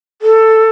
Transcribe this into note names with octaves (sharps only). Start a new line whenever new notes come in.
A4